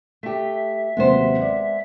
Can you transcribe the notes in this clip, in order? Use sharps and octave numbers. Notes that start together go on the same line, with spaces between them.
A3 G4 E5
D#2 C3 F#3 G#3 B3 C5
D5